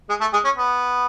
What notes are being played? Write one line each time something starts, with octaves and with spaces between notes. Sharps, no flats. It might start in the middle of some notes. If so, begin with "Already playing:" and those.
G#3 G#4
A3 A4
G#3 G#4
C#4
B3